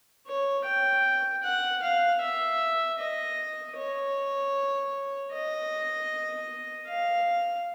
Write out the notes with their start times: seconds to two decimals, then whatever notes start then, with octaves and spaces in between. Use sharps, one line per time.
0.27 C#5
0.65 G5
1.43 F#5
1.82 F5
2.21 E5
2.99 D#5
3.77 C#5
5.33 D#5
6.88 F5